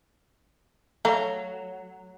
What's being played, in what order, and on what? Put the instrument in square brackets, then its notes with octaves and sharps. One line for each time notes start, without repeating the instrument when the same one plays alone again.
[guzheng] F#3 [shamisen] A3 F5 A#5